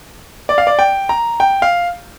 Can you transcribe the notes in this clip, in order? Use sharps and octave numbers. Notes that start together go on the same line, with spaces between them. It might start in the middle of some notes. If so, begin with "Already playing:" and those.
D5
F5
D5
G5
A#5
G5
F5